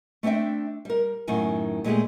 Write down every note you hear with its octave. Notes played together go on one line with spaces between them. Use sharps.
A3 C4 D4 E5 G5
G3 A#4
F#2 A2 D#3 G#5
A#2 G#3 A3 G4 G#4